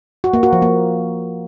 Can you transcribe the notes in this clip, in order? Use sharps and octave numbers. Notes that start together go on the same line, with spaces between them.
F#4
A#3
F#4
F3
A#3